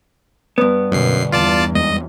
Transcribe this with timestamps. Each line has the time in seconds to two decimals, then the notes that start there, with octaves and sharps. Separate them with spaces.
0.58 G2 B3
0.92 F#2 B2 D3 G3 C7
1.32 E2 F4 D5 A5
1.75 F2 G3 G#3 D#5